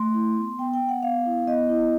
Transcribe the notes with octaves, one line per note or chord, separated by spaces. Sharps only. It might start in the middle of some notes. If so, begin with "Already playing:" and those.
Already playing: A3 C6
E4
B3
B3 G5
G5
B3
F#5
B3 F5
E4
B3 D#5
E4